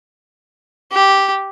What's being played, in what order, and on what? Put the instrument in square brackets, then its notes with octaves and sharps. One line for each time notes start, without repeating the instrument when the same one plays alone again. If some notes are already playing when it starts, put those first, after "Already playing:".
[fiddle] G4